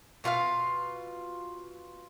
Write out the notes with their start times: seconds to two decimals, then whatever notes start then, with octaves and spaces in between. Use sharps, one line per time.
0.24 B2 F4 A#4 F5